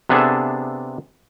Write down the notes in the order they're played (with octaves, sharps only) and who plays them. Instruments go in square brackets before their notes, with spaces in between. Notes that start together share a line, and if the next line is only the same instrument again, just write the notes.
[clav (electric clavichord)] C3 B3 D4 G#4 A4 E5